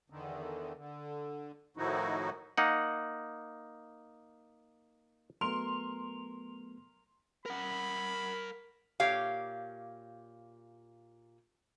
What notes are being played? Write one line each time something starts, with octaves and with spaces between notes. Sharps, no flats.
E2 D3 D#3
D3
A2 D#3 F3 D#4 E4 F#4
A#3 D#4 F#5
F#3 A3 B3 A#4 C6
A#4 F#5 B5
A#2 G4 C#5 F5